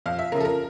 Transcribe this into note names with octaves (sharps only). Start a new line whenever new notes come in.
F2 F5
E5
C#3 F3 A#4
A4
A#4